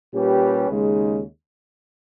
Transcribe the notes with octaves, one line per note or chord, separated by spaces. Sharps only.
A#2 G3 C#4 G4 B4
D#2 C#3 G#3 D#4